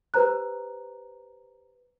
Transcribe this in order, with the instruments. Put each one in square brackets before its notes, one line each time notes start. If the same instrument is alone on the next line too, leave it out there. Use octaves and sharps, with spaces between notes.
[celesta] G4 B4 C5 A#5 F#6